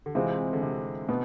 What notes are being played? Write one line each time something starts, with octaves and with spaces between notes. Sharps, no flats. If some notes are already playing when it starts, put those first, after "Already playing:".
D3
C3 E3 G#3 C4 F4
D3
C3
B2 B3